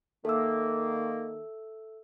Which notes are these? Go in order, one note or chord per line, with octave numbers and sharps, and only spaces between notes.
D#3 A#3 A4 E5 E6